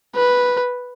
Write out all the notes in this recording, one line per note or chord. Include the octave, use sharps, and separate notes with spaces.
B4